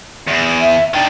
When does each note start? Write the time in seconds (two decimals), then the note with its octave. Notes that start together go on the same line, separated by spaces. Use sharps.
0.28 E2
0.60 E5
0.94 D#3 D4 G5